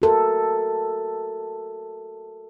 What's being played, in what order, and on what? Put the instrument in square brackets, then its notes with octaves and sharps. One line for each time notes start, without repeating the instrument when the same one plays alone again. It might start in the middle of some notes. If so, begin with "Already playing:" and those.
[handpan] F#4 A4 A#4